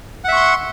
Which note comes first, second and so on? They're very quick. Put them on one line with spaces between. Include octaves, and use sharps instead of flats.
F#5 E5 C#6 C6